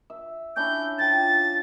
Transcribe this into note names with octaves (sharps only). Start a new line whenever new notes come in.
E5
C#4 D4 E4 G6
F3 G5 A6